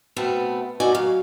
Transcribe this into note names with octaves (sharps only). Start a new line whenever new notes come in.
B2 A3 B3 C4
A3 D#4 F#4 D5 G#5
F#3 F5